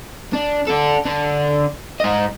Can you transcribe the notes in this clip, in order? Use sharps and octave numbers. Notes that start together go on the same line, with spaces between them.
D4
D4 A4
D3 D4
G#2 D#5